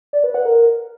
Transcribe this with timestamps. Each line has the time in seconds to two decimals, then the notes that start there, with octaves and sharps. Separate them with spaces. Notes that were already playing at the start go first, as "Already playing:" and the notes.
0.13 D5
0.24 B4
0.34 F#5
0.45 A#4